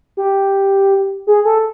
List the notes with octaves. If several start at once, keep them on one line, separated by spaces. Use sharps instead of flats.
G4
G#4
A4